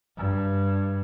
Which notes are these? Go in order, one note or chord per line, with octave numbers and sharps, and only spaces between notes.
G2